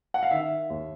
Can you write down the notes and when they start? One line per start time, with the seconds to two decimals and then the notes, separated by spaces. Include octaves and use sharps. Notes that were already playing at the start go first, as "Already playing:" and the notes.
0.14 F#5
0.23 F5
0.31 D#3 E5
0.70 D#2